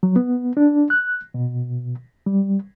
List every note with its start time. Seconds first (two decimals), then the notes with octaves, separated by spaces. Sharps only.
0.03 F#3
0.16 B3
0.57 D4
0.90 F#6
1.34 B2
2.26 G3